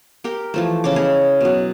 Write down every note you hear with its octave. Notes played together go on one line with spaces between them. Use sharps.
G4 A#4 G5
E3 F3 A3
C#3 C#4 C#5 D6
E4 G#4 C#5 D#5
B2 F#3